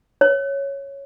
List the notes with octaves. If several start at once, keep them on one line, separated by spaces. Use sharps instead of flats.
C#5